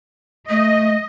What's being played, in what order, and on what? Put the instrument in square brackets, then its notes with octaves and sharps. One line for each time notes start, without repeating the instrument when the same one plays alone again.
[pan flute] A3 [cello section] D#5